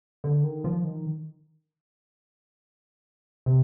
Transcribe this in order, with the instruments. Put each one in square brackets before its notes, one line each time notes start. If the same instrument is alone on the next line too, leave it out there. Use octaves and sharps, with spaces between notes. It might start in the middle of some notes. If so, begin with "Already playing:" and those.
[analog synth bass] D3
D#3
F3
D#3
C3